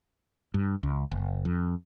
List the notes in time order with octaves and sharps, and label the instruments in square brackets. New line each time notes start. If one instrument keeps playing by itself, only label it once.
[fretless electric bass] G2
C#2
F#1
F2